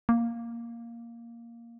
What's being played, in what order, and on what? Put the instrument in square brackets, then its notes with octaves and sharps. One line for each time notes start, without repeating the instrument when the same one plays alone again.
[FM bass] A#3